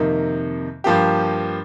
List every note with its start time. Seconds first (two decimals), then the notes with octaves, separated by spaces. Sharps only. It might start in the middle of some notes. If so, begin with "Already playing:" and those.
Already playing: F2 C3 D#3 A#3 D#4
0.84 G2 F3 A#3 G4